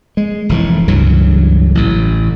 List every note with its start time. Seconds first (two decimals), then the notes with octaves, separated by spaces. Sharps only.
0.17 G#3
0.49 F1 A2 E3
0.88 C#2 G2 E3 F#3
1.75 A1 A2